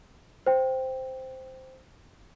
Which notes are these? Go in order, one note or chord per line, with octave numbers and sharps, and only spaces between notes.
C5 G5